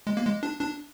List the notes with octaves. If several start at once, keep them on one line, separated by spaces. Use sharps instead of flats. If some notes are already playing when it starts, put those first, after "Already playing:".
G#3
A#3
G#3
D4
D4